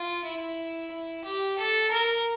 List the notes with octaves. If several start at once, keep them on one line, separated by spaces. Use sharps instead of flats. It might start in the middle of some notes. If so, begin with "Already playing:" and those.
Already playing: F4
E4
E4
G4
A4
A#4